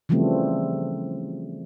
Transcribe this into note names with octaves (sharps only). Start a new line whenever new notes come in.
C#3 E3 F3 G3 A3 C4